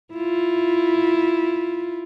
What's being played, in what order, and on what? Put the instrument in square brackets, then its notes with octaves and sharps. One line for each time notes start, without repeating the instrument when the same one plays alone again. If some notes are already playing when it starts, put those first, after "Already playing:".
[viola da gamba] E4 F4